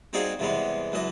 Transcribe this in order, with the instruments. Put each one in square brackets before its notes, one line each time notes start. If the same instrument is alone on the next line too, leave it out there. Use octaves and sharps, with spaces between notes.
[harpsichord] G3 C4 D#4 F4 F#4 G#4
E2 C3 G3 G#3 B3
C#2 F#2 E3 D#5